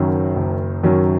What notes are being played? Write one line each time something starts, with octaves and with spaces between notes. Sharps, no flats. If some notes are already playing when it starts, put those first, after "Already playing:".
Already playing: F#1 F#2 D#3 F#3 C#4
F#1
F#2 D#3 F#3 C#4